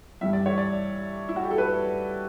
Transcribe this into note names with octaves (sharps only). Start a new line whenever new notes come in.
G2 E3 G3 E5
D5
C#5
D5
E4
F#4
G4
A4
B4